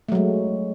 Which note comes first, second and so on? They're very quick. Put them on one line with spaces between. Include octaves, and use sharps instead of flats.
A3 F#3 G#3